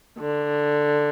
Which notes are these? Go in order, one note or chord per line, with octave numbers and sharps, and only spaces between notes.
D3